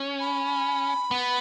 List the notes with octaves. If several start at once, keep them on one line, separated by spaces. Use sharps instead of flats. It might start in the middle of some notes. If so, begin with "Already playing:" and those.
Already playing: C#4
B5
B3